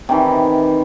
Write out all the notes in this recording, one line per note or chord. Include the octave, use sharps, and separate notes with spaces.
C3 D#3 E3